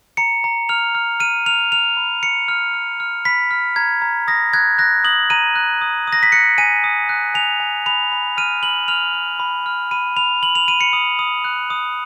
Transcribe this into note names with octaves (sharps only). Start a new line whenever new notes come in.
A#5 C#7
A#5
F6 F7
F6
F6 D#7
F6 F7
F6 F7
B5
F6 C#7
F6
F6
F6
B5 B6
F6
A#5 G#6
A#5
D#6 A#6
F#6 G#6
F#6 A#6
D#6 F#7
A#5 D#7
F#6
D#6
D#6
A#6
B6
F#6 C#7
G#5 D#7
D#6
F#6
G#5 F7
G#5
B5 F7
B5
F6 D#7
B5 F#7
F6 F7
F6
B5
F6
B5 D#7
B5 F7
B5 F#7
F7
B5 D#7
C#7
D#6
D#6
F#6
D#6